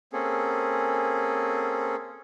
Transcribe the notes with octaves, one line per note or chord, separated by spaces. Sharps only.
A#3 C4 C#4 G#4 A4